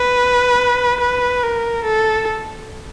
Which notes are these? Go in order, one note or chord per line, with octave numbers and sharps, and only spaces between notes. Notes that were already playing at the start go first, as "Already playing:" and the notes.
Already playing: B4
B4
A#4
A4